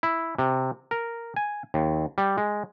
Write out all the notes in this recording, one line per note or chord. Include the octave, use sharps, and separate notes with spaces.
E4
C3
A#4
G#5
D#2
G3
G#3